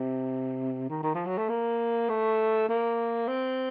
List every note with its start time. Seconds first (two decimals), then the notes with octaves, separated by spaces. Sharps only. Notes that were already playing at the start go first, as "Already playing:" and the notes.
Already playing: C3
0.90 D#3
1.03 D#3
1.14 F3
1.26 F#3
1.38 A3
1.49 A#3
2.09 A3
2.69 A#3
3.28 C4